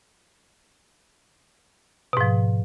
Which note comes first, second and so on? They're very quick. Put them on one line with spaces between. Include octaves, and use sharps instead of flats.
B2 G#2 F3